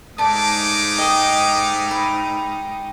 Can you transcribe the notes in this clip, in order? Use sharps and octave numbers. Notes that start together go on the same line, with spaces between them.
G#2 G#3 A3 D#4 D5 A5 D6
D#5 G5 D#6
B5